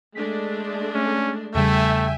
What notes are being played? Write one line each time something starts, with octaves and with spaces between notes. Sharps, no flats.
G#3 A3 D4 B6
C#4
E2 C#3 G3 A3 E5 G5 G#5